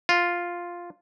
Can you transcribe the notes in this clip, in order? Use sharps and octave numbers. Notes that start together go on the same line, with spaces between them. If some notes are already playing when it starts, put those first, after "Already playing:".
F4